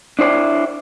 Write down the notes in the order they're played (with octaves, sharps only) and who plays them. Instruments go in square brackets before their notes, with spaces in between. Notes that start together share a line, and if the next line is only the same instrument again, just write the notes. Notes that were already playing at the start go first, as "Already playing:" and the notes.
[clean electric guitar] D4 E4 C5 D5